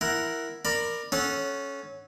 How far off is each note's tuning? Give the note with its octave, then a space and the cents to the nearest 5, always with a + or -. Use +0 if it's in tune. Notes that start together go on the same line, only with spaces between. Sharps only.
E4 +10 A#4 +0 F#5 +0
A#4 -5 D5 +20 B5 +10
C#4 +0 A4 -25 F#5 +0